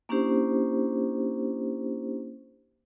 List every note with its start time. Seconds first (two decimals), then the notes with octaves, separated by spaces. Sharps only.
0.09 A#3 C#4 D4 E4 G4 C5